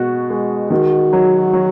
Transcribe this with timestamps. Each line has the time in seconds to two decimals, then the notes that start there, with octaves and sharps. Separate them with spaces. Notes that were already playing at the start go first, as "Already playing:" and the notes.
Already playing: B2 G#3 F#4
0.30 G#3
0.70 D#3 F#4
1.13 F#3
1.53 F#3